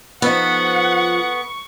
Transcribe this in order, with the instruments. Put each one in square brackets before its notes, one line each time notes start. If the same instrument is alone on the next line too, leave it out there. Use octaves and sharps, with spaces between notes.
[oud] F3 D#4 [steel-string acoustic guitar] B3 A4 [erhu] F#5 [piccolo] C#6